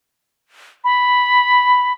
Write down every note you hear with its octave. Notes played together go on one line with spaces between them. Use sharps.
B5